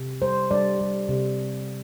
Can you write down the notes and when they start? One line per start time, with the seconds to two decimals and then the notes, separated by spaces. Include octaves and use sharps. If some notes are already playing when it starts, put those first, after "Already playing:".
Already playing: C3
0.22 G3 C5
0.51 G3 D5
0.81 G3
1.09 C3